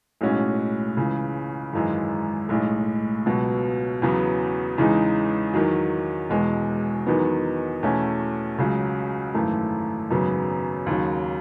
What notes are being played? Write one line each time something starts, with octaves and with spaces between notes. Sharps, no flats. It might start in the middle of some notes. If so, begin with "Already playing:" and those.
B1 A2 G#3 C#4 F#4
C#2 C#3 E3
G#1 F#2 E3 G#3
B1 A2 G#3
C#2 B2 F#3 B3
E2 C#3 F#3 B3
E2 C#3 E3 G#3 D#4
E2 D#3 F#3
E1 E2 B2 G#3
E2 D#3 F#3 B3 D#4
E2 B2 A3 C#4 E4
C#2 C#3 F#3
G#1 F#2 E3 A3
G#1 F#2 C#3 F#3 B3
D#2 C#3 F#3